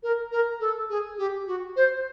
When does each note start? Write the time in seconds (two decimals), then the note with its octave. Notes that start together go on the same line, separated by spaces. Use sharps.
0.03 A#4
0.32 A#4
0.60 A4
0.90 G#4
1.18 G4
1.47 F#4
1.76 C5